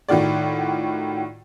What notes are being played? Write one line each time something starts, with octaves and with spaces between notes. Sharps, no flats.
A2 D#3 F4 F#4 D5